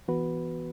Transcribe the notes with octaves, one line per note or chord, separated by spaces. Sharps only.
E3 B3 F#4 B4